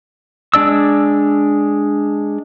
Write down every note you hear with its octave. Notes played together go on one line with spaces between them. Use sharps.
G#3 D4 D5 E6